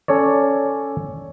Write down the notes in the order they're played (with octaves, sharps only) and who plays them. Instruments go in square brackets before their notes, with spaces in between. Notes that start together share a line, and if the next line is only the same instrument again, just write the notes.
[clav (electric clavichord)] C#4 A4 C#5 D5